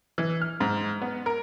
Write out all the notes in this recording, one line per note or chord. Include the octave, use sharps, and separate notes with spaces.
E3
F6
G#2
B3
A#4